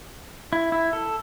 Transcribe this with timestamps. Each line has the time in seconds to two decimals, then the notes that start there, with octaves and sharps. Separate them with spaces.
0.53 E4
0.72 E4
0.93 A4